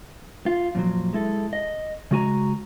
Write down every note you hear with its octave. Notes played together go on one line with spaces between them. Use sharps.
F4
F2 A#2 D#3 F#3
G#3 E4 A4
D#5
C#3 G#3 F#4 A#4 G#5 A#5